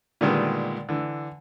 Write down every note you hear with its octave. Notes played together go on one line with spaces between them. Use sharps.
A#2 D3 D#3 G3 G#3 B3
D3 E3